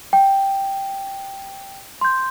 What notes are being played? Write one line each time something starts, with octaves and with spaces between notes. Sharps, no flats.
G5
C6 G6